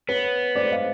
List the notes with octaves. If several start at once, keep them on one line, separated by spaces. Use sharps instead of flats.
B3 B4 C#5
C5 D5
D#5 F5